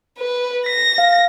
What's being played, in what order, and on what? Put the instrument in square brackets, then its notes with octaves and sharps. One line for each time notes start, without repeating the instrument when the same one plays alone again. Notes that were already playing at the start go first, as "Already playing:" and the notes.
[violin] B4
[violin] A#6 [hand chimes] B6
[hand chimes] F5